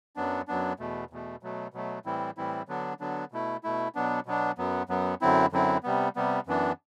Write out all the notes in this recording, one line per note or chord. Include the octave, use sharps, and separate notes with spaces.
F#2 F#3 B3 D4
F#2 F#3 B3 D4
E2 B2 A3
E2 B2 A3
B2 F#3 A3
B2 F#3 A3
A2 E3 G3 C4 E4
A2 E3 G3 C4 E4
D3 F#3 B3 D4
D3 F#3 B3 D4
B2 A3 E4
B2 A3 E4
B2 F#3 B3 D4
B2 F#3 B3 D4
F#2 F#3 B3
F#2 F#3 B3
F#2 D3 F#3 C4 E4
F#2 D3 F#3 C4 E4
C3 G3 B3
C3 G3 B3
F#2 E3 B3 D4